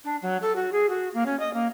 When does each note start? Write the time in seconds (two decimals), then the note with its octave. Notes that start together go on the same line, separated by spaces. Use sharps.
0.05 D4
0.22 F#3
0.42 A4
0.56 F#4
0.72 G#4
0.89 F#4
1.14 A#3
1.26 C#4
1.39 D#5
1.54 A#3